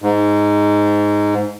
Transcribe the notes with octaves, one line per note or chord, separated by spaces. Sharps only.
G#2